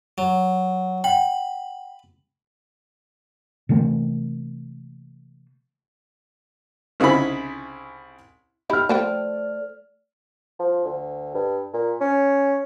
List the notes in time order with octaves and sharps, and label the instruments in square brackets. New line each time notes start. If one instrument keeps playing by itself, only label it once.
[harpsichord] F#3
[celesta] F#5 G5 [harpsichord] B5
[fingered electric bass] C3 E3 A3 A#3
[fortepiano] C2 C#3 D#4 E4 G#4 B5
[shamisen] D#4 E4 G4 [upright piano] B5 F6
[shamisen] F3 B4 G5 [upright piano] A3 [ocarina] D5
[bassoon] F3
D2
G2
A#2
C#4